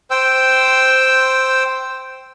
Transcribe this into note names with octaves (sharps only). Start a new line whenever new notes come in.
C5 G5 E6